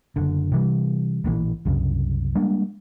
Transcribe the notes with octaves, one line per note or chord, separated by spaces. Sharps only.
F#1 D3
C3 E3 G3
A1 A#2 C#3 E3
C2 F#2 C#3
G3 G#3 A#3 D4